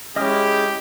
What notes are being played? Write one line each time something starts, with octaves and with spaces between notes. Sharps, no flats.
G#3 C#4 E4 G4 D#5 D#6 F6